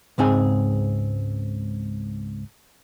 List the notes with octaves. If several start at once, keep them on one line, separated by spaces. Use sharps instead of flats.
C#2 G#2 C4 G#4 G#5